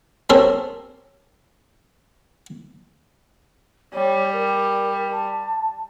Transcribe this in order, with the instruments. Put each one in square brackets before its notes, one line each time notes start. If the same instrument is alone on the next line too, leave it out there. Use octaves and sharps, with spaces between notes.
[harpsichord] C4 C#4 G4 A4 A#4 C5
[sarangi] G3 [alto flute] C#5
[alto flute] A#4
A5